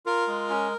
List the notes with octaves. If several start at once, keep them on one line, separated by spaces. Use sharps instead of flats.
F4 A#4
G#3
C#4